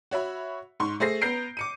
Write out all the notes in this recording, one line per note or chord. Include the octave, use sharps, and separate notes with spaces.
F#4 C#5 E5 B5
G#2 C6 C#6
A3 G#4 C5 A#6 C7
B3 A#5 G6 C7 D7
D6 C#7 D#7